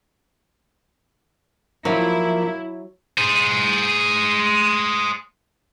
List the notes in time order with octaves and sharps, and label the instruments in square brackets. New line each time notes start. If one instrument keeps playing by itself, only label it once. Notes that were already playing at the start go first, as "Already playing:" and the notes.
[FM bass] F3 [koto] F#3 [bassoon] A#3 [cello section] E4
[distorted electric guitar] G#4 C5